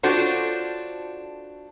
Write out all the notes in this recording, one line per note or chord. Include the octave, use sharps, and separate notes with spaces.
D4 F4 F#4 A4 C5 C#5